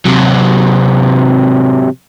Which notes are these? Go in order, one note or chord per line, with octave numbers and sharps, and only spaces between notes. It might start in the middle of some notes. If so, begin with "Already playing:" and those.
C3 F#3